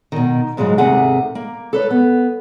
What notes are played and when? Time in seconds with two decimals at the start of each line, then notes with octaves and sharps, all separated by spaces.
0.12 B2 D#3
0.57 G#2 C#3 F3 F#3 G#3
0.78 D#2 G#2 C3 A3 G#4 F#5
1.35 A#3
1.73 A4 B4 C#5
1.91 B3